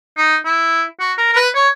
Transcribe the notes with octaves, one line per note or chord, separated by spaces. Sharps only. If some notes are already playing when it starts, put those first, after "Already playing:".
D#4
E4
F#4
A#4
A#4
B4
C#5